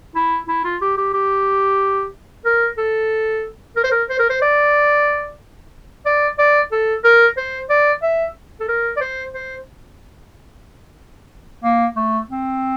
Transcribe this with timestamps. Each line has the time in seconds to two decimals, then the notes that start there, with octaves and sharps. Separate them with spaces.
0.15 E4
0.48 E4
0.64 F4
0.81 G4
0.97 G4
1.14 G4
2.45 A#4
2.77 A4
3.76 A#4
3.84 C5
3.91 A#4
4.09 C5
4.19 A#4
4.30 C5
4.41 D5
6.05 D5
6.38 D5
6.72 A4
7.04 A#4
7.37 C5
7.70 D5
8.02 E5
8.60 A4
8.68 A#4
8.97 D5
9.01 C5
9.33 C5
11.63 A#3
11.96 A3
12.29 C4